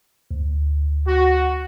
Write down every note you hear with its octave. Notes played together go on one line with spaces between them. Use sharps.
D2
F#4